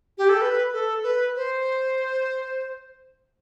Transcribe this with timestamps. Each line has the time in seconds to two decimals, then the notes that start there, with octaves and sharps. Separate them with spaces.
0.18 G4
0.29 A4
0.41 B4
0.73 A4
1.03 B4
1.36 C5